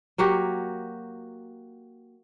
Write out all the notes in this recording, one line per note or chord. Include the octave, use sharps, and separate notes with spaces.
F#3 A#3 F#4 G4